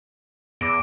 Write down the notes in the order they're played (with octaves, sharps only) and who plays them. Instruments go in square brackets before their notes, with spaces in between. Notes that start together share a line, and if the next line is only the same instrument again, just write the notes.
[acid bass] E2 [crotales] D6 A#6 D7